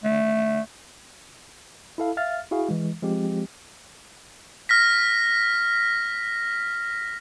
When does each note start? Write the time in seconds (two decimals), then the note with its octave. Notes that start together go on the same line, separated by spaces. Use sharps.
0.04 A3
1.98 E4 A4 F5
2.17 E5 F5 F6 A6
2.51 E4 F#4 G#4 F5
2.69 E3 G#3
3.02 F3 G#3 C4 G4
4.69 F6 A#6 B6